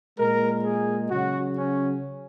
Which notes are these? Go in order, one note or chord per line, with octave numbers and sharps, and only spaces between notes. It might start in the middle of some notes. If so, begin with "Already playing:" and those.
A#2 G#3 A#4
G#4
C#3 F#3 F#4
C#4